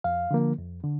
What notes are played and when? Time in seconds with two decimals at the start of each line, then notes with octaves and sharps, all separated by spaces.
0.04 F2 F5
0.31 D3 F3 A#3
0.58 F2
0.84 D3